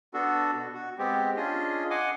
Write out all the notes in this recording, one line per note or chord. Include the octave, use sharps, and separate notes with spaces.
B3 D4 F#4 A4
B2
F#4
G#3 B3 C4 G4
C#4 D4 F4 G#4 D#5
D#5 F#5 G#5 C6 D6